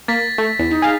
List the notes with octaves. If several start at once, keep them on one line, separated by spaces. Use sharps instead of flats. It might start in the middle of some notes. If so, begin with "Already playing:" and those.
A#3 A6 B6
A3
E2
D#4
G#4 F5